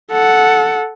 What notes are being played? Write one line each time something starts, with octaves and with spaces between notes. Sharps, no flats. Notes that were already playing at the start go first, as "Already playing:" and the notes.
A4 F#5